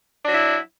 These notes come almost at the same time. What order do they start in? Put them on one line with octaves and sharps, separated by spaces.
D4 F#3 E4